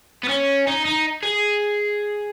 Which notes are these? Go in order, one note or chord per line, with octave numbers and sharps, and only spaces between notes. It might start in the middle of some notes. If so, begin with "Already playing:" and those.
B3
C#4
D#4
D#4
G#4